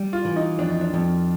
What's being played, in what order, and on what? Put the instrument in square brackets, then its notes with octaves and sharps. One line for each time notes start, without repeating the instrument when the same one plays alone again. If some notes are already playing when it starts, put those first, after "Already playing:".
Already playing: [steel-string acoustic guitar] G3
[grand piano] F4
[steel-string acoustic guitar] E3
[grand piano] D#4
[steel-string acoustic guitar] F2 [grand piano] D4
[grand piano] D#4
D4
[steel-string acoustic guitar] F2